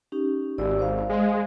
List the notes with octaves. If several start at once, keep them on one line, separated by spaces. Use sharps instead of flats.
C#4 D#4 G4
G#1 G4 D5 E6
C5 F5
G#3